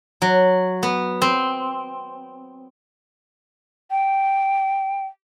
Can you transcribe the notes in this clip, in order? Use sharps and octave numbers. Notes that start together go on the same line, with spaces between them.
F#3
B3
C4
G5